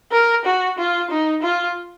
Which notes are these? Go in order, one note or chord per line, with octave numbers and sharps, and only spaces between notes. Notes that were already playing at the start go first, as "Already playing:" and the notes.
A#4
F#4
F4
D#4
F4